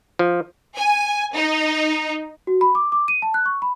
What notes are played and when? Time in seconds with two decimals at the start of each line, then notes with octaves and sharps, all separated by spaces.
0.19 F3
0.76 G#5
1.34 D#4
2.47 F#4
2.61 B5
2.75 D6
2.92 D6
3.08 D#7
3.22 A5
3.34 F#6
3.46 C#6
3.62 B5